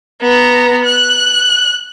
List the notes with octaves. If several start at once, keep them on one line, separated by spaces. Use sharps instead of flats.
B3 A#5
F#6